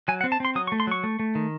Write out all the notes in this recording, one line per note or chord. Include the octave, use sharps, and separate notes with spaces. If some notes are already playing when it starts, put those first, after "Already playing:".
F#3 G#5
F#5
C4
A5
C4 C6
F#3 D#6
C#6
A3
C6
F#3 C#6
A3
A3
D#3